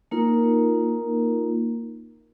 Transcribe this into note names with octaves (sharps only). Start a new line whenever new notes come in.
A#3 D#4 F4 A#4